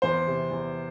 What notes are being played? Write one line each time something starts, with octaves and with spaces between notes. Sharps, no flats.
E2 C5
C3
E2